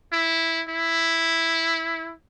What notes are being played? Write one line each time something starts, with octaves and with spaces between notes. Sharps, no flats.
E4
E4